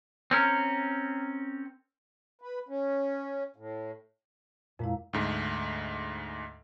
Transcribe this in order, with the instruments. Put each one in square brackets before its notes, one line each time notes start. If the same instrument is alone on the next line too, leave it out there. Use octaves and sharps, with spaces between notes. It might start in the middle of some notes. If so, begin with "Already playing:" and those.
[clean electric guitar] C4 C#4 A#4
[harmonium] B4
C#4
A2
[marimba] F2 G#3 E4 [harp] A#2
[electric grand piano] D2 G#2 A3